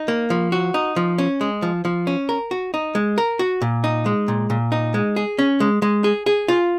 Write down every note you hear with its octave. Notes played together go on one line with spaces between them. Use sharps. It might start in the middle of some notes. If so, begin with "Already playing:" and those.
Already playing: D#4
A#3
F3
F#4
D#4
F3
C#4
G#3
F3
F3
C#4
A#4
F#4
D#4
G#3
A#4
F#4
A#2
D#4
G#3
A#2
A#2
D#4
G#3
G#4
C#4
G#3
G#3
G#4
G#4
F4